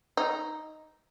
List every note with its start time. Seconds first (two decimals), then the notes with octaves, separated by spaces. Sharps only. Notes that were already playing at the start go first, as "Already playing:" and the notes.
0.17 D#4